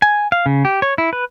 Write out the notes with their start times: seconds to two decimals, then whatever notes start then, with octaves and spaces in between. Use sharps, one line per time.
0.02 G#5
0.32 F5
0.46 C#3
0.65 G4
0.82 C#5
0.98 E4
1.13 B4